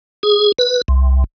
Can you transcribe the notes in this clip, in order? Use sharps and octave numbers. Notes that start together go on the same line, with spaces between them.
G#4
B4
C2